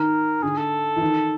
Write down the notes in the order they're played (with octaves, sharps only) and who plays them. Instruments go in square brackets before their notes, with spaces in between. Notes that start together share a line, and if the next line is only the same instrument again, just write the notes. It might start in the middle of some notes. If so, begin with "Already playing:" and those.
Already playing: [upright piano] D#3 [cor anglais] A#4
[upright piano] D3 [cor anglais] G#4
[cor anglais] A4
[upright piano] E3
D#3